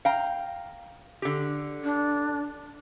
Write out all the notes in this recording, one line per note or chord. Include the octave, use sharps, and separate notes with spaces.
F5 G5 A#5
D3 G4
D4